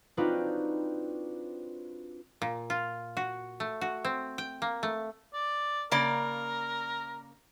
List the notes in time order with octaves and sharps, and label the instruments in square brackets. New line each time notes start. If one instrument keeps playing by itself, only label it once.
[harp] C4 D4 D#4 F4 F#4 B4
[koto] A#2
F4
F#4
A3
F#4
C4
G5
A#3
A3
[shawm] D5
[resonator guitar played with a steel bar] C#3 A#3 D5 [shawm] A#4